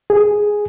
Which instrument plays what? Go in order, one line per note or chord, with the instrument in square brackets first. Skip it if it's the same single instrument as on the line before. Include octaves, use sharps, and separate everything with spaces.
[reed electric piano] G#4